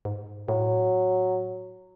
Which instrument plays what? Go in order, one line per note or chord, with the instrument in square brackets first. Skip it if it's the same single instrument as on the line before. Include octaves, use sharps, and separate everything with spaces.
[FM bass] G#2
[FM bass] A2 [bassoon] F#3